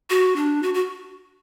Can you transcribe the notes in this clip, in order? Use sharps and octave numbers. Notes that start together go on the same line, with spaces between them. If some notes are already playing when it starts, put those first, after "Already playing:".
F#4
D4
F#4
F#4